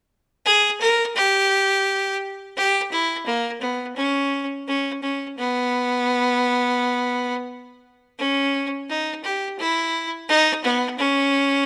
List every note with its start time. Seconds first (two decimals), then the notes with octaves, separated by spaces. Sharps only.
0.45 G#4
0.81 A#4
1.16 G4
2.57 G4
2.92 E4
3.26 A#3
3.61 B3
3.96 C#4
4.67 C#4
5.02 C#4
5.38 B3
8.18 C#4
8.89 D#4
9.24 G4
9.59 E4
10.28 D#4
10.64 B3
10.99 C#4